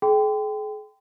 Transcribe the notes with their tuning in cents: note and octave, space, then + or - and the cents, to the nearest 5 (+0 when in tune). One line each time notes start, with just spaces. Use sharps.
G#4 +40 G5 +0 C6 -35